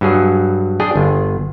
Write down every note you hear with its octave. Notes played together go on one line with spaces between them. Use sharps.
G2 F#3 G#4
D4 G#4 G5
G1